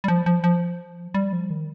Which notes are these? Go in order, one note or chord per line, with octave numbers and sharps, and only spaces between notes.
G3
F3
F3
F3
G3
F3
D#3